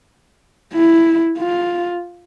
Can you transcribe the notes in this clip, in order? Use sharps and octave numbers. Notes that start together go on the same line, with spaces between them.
E4
F4